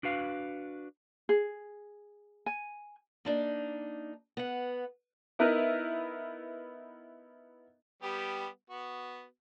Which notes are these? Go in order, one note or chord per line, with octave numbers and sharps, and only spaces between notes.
D4 F#4 B4 F5
G#4
G#5
A#3 D4 D#4
B3 F#5
B3 D#4 E4 A#4 B4
G3 B3 G4
B3 F#4